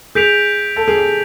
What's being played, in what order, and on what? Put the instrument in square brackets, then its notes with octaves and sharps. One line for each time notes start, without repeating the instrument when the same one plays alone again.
[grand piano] G#4 [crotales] G6 B6 D7 F7
[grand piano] A4
G#4
G4